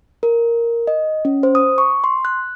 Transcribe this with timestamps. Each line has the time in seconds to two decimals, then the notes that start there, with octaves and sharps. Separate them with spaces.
0.23 A#4
0.87 D#5
1.25 C#4
1.43 C5
1.55 D#6
1.78 C#6
2.04 C6
2.25 F#6